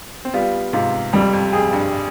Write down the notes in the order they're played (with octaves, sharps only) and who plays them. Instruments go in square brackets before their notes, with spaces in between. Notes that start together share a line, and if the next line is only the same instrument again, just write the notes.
[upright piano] C4
[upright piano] G3 B3 [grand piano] F4
[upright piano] G#2 C3 [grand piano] F4
[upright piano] F2 [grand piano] G3
[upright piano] F2
[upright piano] F2 [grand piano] G#4
[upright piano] G2